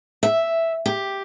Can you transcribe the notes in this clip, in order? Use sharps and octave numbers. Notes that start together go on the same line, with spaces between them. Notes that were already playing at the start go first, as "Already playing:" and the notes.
E5
G4